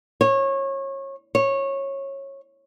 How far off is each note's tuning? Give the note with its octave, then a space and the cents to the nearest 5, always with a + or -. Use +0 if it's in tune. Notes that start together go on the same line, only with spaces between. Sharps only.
C#5 -25
C#5 -15